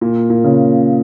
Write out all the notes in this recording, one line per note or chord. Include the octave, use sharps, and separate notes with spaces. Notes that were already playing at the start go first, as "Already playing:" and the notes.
A#2
A#2
C#3